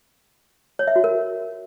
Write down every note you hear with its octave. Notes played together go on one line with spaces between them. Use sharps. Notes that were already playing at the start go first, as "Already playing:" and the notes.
C#5
E5
F#4
A#4